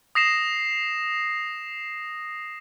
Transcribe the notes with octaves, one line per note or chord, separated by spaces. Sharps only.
D#6 A#6 C7 E7